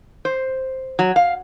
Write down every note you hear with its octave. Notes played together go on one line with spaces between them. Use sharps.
C5
F#3
F5